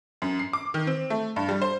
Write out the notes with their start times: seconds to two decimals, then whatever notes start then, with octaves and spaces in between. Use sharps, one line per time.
0.22 F#2
0.39 C7
0.53 D6
0.74 D#3
0.87 C4
1.10 A3
1.36 G2
1.49 G3
1.62 C5